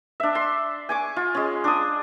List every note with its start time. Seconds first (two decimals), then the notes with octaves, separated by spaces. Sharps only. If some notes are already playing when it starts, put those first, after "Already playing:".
0.20 D4 E5
0.35 C6
0.89 G#5 C#6 D6
1.16 F4
1.35 G#3 C#4
1.64 D4 D#6